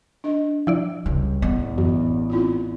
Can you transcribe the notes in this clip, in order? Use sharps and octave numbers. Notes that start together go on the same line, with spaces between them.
D4 D#5
F3 E4 D5
C#2 G3
A1 E2 E3 B3
F#2 E3
C4 E4 F4